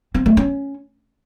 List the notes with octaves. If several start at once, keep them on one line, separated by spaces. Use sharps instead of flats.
C4
A3
C#4